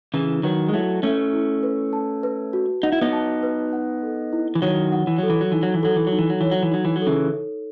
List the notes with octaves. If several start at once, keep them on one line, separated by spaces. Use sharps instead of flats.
C#3 E3 E4
D#3 F#3 B4
G#3
F#3 A3 E4
A3 C#4 E5
E4
B4
A5
B4
F#4
D#4 F#5
E4
B3 D#4
A5
B4
F#5
A4
E4
E3
D#3 F#3 C#5
F#5
E3
F#3 A4
E3
F#3
E3 D#4
F#3
E3
F#3 A4
E3
F#3 D#4
E3
F#3
E3 C#5
F#3
E3
F#3 D#4
E3
F#3
A4
C#3 E3